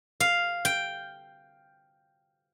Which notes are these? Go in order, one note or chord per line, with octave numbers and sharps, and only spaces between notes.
F5
G5